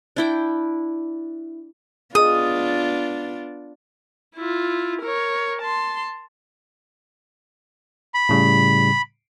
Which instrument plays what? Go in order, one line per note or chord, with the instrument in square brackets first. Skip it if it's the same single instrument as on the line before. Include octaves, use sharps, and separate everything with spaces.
[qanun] D4 E4 G5
[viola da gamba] B3 D4 F4 [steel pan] G#4 D#5 [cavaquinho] D#6
[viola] E4 F4
A#4 C#5
A5 C6
[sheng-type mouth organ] B5
[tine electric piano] A2 C#3 G3